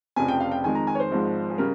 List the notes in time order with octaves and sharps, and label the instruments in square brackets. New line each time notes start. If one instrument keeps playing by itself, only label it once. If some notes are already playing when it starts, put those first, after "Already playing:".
[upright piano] F1 F2 C#3 G#5
G5
F5
G5
F2 D#3 G#3 G#5
A#5
G#5
C#5
C5
G#1 G#2 F3 G#3
G#4
C#3 G3 A#4